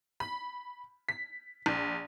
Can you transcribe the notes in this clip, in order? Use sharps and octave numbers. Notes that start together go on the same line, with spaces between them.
B5
B6
A#1